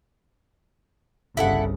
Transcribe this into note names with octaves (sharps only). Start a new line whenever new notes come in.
G1 C2 C#3 E4 A4 F#5